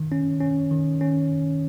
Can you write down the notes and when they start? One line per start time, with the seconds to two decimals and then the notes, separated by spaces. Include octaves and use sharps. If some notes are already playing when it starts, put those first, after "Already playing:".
Already playing: D#3
0.12 C#4
0.41 C#4
0.71 D#3
1.01 C#4